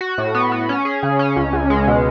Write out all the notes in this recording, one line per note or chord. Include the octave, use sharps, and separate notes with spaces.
F#4
A2
B3
B3
C#4
G#4
C#3
C#4
C#2
C#2
G#3
B2